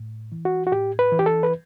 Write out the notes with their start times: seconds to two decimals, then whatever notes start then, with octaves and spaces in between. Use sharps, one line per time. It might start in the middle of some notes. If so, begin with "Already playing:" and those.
Already playing: A2
0.32 E3
0.45 F#4
0.67 F#4
0.72 A2 G4
0.99 B4
1.12 E3
1.19 G4
1.26 A4
1.43 B4